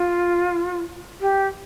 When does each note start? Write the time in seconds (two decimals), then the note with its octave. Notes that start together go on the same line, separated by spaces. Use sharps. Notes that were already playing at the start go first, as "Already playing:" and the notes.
Already playing: F4
1.20 G4